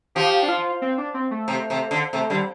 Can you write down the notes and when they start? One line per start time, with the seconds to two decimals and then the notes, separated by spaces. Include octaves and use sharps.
0.15 F3 G4
0.43 D4
0.49 F4
0.82 C4
0.98 D4
1.14 C4
1.31 A3
1.48 C3
1.70 C3
1.91 D3
2.13 C3 A3
2.30 D3 G3